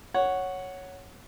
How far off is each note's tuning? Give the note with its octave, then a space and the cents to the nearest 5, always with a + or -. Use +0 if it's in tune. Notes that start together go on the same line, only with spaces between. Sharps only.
C#5 +0 F#5 +0